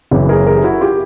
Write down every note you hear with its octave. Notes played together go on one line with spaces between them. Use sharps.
F#1 F#2 C#3 E3
G#4 A#4
G#4 A#4
G4
E4 F#4
F4 G4